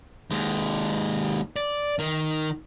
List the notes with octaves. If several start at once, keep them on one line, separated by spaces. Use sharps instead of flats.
D#2 G#3
D5
D#3